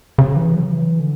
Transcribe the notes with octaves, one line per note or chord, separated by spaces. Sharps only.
C#3
E3
F#3
E3
D3